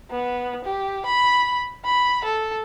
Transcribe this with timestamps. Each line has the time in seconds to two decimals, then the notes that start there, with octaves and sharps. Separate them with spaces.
0.11 B3
0.65 G4
1.06 B5
1.85 B5
2.25 A4